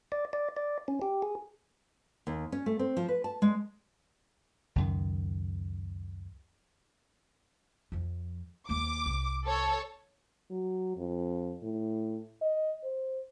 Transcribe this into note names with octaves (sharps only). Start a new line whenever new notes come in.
D5
D5
D5
C#4
G4
G#4
D#2
C#4
A3
C4
F3
B4
A5
G#3
C#2 F#2 D#3
F2 F3
D#2 A#3 D6
C2
A4 C#5
F#3
F2
A2
D#5
C5